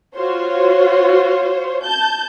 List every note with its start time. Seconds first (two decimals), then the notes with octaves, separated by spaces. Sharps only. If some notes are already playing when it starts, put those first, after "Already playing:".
0.16 F4 F#4 C5 C#5
1.83 A5 G6